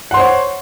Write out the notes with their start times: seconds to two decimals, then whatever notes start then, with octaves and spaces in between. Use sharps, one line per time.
0.11 F#5
0.14 C6
0.17 C5
0.20 C#5